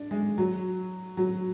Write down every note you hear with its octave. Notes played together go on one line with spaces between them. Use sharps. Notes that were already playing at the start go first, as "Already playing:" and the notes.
Already playing: D4
G#3
F#3
F#3